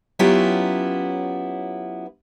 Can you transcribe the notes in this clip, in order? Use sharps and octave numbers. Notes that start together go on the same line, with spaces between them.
F#3 B3 C#4 E4 F4 G4